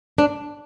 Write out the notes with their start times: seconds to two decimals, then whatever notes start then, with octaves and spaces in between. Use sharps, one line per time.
0.18 D4